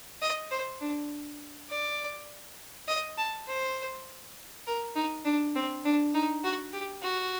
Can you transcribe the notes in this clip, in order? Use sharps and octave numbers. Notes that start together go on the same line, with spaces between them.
D#5
C5
D4
D5
D#5
A5
C5
A#4
D#4
D4
C4
D4
D#4
F#4
G4
F#4